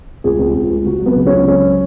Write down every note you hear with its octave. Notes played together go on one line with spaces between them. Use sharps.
C#2 G#4
C#2
C#2
C#2
C#2 F#4
F#3
B3
C#3
C#4
C#2
F#3 C#4